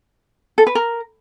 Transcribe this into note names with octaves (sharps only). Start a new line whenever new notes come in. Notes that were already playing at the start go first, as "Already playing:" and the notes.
A4
B4
A#4